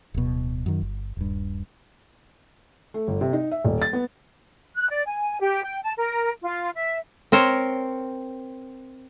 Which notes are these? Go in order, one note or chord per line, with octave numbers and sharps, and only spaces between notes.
D1 B2
F#2 D#3
G1
D#1 G2
A3
G1
C3
D#4
E5
D#1
A6
B3
F#6
D5
G#5
G4
G5
A5
A#4
F4
E5
C4 A#4 C5 C#5